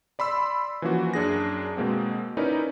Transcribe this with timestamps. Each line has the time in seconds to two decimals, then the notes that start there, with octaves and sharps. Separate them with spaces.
0.19 D5 B5 C6 E6
0.82 E3 F3 A#3 C#4 F#4
1.14 F#2 D4 G#4 A#6
1.77 B2 G#3 A#3 C4
2.37 C#4 D#4 E4 A#4 B4 D5